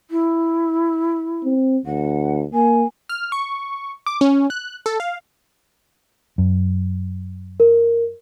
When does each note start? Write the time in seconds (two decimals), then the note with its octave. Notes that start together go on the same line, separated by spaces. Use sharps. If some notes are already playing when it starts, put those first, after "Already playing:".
0.10 E4
1.44 C4
1.86 D2 F#5
2.53 A#3 G#5
3.09 F6
3.32 C#6
4.06 D6
4.21 C#4
4.50 F#6
4.86 A4
5.00 F5
6.38 F#2
7.60 A#4